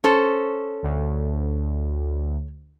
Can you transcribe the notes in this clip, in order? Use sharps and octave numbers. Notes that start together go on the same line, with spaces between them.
C#4 A4 C5
D2